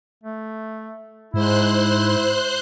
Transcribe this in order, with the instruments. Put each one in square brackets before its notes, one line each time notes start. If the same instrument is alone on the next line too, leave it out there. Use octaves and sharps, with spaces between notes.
[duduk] A3
[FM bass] G#2 [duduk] E4 [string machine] C5 C6 F#6